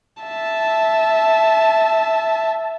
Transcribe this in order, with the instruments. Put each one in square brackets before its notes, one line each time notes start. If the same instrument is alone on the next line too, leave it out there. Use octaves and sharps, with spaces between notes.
[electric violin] E5 A5